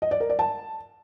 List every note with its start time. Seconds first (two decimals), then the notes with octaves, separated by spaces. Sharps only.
0.02 D#5
0.11 D5
0.20 A#4
0.30 D5
0.39 A5